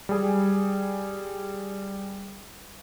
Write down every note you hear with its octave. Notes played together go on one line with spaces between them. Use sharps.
G3 G#4